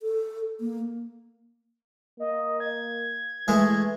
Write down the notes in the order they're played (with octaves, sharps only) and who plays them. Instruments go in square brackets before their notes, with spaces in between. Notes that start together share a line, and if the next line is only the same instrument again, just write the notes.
[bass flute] A4
A#3
[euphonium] A#3 [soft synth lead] D#5
[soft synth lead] G#6
[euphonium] E3 [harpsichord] G#3 A3